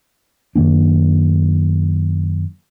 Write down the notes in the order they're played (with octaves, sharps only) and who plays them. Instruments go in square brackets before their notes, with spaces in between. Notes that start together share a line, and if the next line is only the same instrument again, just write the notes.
[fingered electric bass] F#2 D#3 A#3 D4